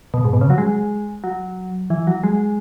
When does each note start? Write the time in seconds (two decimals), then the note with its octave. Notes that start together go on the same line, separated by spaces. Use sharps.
0.14 B2
0.25 G#2
0.33 B2
0.41 C#3
0.50 F#3
0.58 G#3
1.24 F#3
1.90 E3
2.07 F#3
2.23 G#3